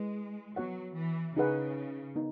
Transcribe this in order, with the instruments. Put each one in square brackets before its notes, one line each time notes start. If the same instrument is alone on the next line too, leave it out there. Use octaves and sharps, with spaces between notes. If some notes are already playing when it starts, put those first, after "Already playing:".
Already playing: [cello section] G#3 [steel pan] E4 G#4 B4 D#5
[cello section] F#3 [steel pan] B3 F#4 C#5 F#5
[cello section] E3
[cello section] C#3 [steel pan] D#4 G#4 B4 F#5
[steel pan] B3 D#4